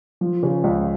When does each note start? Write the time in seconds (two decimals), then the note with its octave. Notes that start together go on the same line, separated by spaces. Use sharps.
0.21 F3
0.43 C#3
0.64 C#2